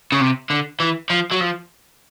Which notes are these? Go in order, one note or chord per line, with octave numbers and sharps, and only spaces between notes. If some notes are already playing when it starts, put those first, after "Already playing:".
C#3
C3
D3
E3
F3
F#3
F3